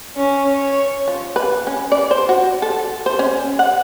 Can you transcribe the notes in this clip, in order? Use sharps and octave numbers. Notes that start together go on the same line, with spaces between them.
C#4
C#5
F3
B4
C#4
D5
C5
F#4
A4
C5
C#4
F#5